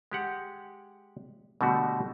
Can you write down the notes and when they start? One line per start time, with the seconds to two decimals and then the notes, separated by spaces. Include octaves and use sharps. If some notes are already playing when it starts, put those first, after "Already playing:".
0.12 G#3 G4 F#5
1.61 B2 D3 G3 A3 F#4